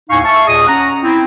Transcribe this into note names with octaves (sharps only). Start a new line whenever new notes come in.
D#2 A2 D#4 F5 G#5 C#6
E5 F5 A5 C#6
D#2 A#2 G#4 D#5 D#6
C#4 F#5 A#5
C4 E4